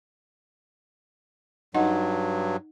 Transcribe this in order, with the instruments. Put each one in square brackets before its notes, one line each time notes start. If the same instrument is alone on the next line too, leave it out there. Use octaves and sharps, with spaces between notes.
[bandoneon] G2 F#3 [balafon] D#4 D#5 F#5